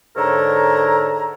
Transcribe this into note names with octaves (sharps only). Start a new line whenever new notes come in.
G#2 D3 A4 A#4 C#5 A#5